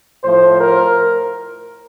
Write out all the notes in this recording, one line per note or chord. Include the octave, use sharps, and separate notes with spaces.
A2 F3 C5
A#4